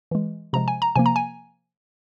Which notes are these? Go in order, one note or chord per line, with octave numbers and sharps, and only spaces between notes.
E3 G#3
C3 F3 G#3 A#5
G#5
A#5
C3 F3 A#3 G#5
A#5
G#5